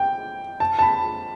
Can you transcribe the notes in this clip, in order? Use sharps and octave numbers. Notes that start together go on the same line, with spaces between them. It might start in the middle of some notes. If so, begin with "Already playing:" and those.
Already playing: G5
A5
A5
B5